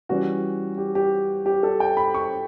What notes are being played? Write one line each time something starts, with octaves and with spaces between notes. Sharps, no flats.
E3 G3 C#4 F#4
G4
G4
G4
A4
G5
B5
C#6